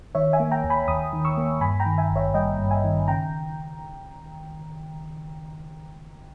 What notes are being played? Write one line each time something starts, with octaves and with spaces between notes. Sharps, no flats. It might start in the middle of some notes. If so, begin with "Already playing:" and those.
D#3 C#5 E5
E5 G#5
A#3
G5 A#5
D#2
G#5 B5
D#2 B5 D#6
D#3
C#6 E6
A#3
G2 G#5 B5
G5 A#5
D#3
E5 G#5
G#1
C#5 E5
G3 D#5 G5
G2
E5 G#5
D#3
C#3 G5 A#5